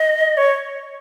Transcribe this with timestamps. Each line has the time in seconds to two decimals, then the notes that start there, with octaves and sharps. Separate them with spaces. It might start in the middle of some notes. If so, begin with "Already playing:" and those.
Already playing: D#5
0.37 C#5